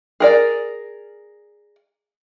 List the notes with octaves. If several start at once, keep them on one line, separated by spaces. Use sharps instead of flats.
G#4 A#4 D5